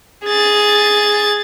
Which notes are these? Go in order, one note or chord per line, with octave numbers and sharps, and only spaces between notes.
G#4 A6